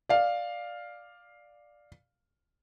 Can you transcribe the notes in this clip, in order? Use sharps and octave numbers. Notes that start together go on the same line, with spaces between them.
D5 F5